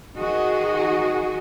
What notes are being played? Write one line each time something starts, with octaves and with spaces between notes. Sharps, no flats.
D#3 F#4 G#4 D#5